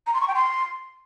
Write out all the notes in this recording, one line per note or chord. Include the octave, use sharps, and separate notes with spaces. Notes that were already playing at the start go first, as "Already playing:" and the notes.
A#5
C6
C#6
G5
C6